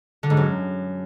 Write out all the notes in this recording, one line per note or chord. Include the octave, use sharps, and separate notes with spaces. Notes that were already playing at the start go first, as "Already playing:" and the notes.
D3
G#2
F#2